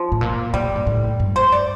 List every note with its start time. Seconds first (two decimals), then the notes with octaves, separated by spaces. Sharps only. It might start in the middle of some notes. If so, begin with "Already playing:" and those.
Already playing: F3
0.12 A2
0.21 A#2
0.53 A#2 G3
0.75 G2
0.87 A2
1.20 G2
1.36 C5
1.52 D5